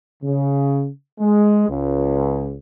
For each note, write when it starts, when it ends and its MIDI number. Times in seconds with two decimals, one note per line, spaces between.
0.22 0.87 49
1.20 1.67 56
1.68 2.55 37